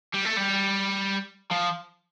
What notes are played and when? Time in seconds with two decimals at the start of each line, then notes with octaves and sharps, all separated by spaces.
0.14 G3
0.25 A3
0.36 G3
1.51 F3